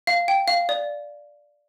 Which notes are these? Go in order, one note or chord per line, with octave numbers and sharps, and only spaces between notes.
F5
G5
F5
D5